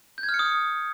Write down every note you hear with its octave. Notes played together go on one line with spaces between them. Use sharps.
G6
G#6
F6
C#7
D#6